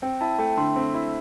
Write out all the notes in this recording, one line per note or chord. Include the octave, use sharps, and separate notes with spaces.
C4 G5
E4 A5
A3 G5
D3 C6
C4
E4